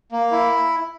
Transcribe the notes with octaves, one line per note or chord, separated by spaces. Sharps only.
A#3
E4